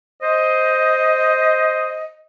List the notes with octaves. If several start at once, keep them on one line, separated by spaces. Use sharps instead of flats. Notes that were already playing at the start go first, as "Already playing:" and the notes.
C5 D#5